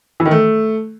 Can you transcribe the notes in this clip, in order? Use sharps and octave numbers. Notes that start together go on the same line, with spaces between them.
E3
D#3
A3